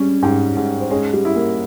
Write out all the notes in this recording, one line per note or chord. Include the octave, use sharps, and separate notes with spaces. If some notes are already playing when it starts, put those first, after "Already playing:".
Already playing: G3 C#4 G#4
G#2 G4 G5
G#2
C5
G#3 C#4 C#5
G3 G4
E4
A#3 A#4